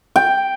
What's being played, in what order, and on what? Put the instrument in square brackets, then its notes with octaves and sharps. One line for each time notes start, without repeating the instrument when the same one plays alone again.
[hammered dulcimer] G5